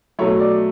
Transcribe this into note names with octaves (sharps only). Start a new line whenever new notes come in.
B2 F#3 A3 C#5
D5